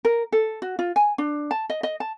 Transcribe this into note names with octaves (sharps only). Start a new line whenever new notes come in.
A#4
A4
F#4
F4
G#5
D4
A5
D#5
D#5
A5